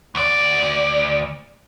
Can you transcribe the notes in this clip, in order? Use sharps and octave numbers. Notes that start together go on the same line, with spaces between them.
D2 D5